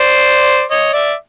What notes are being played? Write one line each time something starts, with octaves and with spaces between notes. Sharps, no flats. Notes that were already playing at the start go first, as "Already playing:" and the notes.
Already playing: C5 D5
C#5 D#5
D5 E5